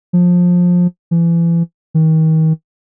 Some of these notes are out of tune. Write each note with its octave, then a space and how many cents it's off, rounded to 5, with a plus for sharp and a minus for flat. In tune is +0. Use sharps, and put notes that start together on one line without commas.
F3 +20
E3 +35
D#3 +35